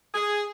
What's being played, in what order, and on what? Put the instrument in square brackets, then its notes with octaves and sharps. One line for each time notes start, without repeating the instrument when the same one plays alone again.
[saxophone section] G#4